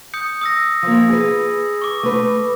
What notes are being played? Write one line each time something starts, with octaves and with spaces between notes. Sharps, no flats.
D#6 G6 C#7
D#6 E6 A#6
F3 A#3
G#4 B4
C#6 D6
A3 B4